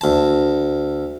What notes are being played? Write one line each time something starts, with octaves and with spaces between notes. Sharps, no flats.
D2 A5